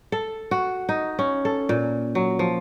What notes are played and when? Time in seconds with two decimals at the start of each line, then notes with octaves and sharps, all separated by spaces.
0.12 A4
0.51 F#4
0.89 D#4
1.19 C#4
1.45 A4
1.69 A#2
2.15 F#3
2.39 F3